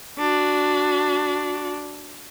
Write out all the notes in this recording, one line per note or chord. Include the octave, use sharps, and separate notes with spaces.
D4 F#4